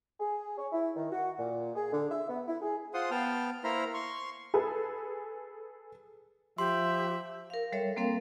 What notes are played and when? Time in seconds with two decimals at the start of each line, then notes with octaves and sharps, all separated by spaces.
0.20 G#4
0.58 C#5
0.72 E4
0.96 D#3
1.11 F#4
1.38 A#2
1.75 G#4
1.92 D3
2.11 E5
2.29 B3
2.48 E4
2.62 G#4
2.94 F4 C5 F#5 C6 D#6
3.11 B3 G5 A5 F6
3.64 A#3 E4 C5 A#5 B5 F6
3.94 C6 C#6
4.54 G#4 A4 B4
6.58 F3 G4 E5 C6
7.50 A#4 F5
7.72 G3 A4 C#5 E5
7.96 G3 A#3 C4 A4 A#4 F5